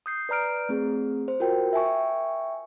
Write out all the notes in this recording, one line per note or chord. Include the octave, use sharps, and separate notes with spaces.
D#6 G6 C7
B4 D5 A#5 F6 D7
A3 C4 G#4
C5
F4 F#4 A#4 G5
E5 G5 G#5 C#6